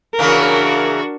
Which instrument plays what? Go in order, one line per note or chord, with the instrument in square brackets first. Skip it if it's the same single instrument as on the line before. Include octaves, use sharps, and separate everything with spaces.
[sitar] C#3 E3 A#3 [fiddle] D4 F#4 [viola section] A#4